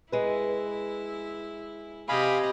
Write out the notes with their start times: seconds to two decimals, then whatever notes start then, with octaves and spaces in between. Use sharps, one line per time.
0.12 G#3 E4 B4
2.09 C3 G4 D#5 F5 G#5 B5